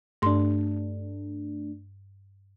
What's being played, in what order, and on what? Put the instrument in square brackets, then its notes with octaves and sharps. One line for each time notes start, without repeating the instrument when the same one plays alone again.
[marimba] G2 C6 [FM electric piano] A3 D4